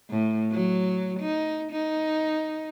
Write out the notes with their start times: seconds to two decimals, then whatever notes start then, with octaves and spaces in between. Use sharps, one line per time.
0.10 A2
0.52 F#3
1.20 D#4
1.72 D#4